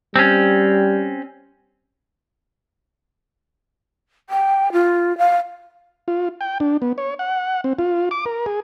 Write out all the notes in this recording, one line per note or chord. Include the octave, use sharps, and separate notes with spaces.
G3 C4 C#4
G5
F4
F5
F4
G5
D4
B3
C#5
F#5
C4
F4
D6
A#4
G#4